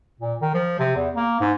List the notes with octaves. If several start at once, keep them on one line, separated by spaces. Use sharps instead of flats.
A#2
D#3
F3
C3
E2
A#3
G#2